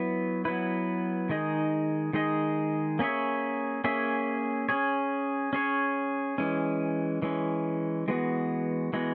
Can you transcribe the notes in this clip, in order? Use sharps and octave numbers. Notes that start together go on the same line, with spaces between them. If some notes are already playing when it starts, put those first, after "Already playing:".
Already playing: F#3 B3 E4 B4
F#3 B3 E4 B4
D#3 G#3 D#4 G#4 D#5
D#3 G#3 D#4 G#4 D#5
A#3 C#4 G#4 C#5 E5
A#3 C#4 G#4 C#5 E5
C#4 G#4 C#5
C#4 G#4 C#5
E3 G#3 C#4
E3 G#3 C#4
E3 G#3 B3 F#4
E3 G#3 B3 F#4